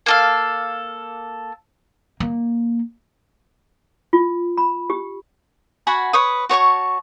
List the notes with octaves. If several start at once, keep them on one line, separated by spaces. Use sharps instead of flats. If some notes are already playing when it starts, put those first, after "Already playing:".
A#3 A4 F5
A#3
F4
B5
G4
F#4 F#5 G#5 B5
B4 C#5 D#6
F#4 C#5 A5 C#6